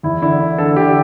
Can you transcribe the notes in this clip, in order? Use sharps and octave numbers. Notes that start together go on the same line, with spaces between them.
E2 E4
D3 E4
D3
D3 A4
D3 G4